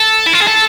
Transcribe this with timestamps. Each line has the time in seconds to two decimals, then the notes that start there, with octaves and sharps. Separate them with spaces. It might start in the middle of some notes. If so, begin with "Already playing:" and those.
Already playing: A4
0.26 E4
0.33 F4
0.41 G#4
0.47 A4